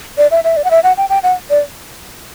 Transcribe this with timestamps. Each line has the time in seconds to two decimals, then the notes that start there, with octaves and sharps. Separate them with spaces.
0.18 D5
0.31 E5
0.44 E5
0.57 D5
0.64 F#5
0.71 E5
0.83 F#5
0.97 G5
1.10 G5
1.23 F#5
1.50 D5